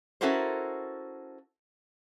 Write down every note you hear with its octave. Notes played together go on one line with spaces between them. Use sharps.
C#4 E4 F#4 A4 A#4 C5